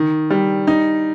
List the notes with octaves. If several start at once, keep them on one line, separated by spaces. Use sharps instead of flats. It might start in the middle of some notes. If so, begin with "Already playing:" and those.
Already playing: D#3
G3
D#4